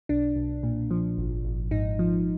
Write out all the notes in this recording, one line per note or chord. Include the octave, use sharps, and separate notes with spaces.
B1 D4
B1
A#2
F3
G#1
G#1
G#2 D#4
F3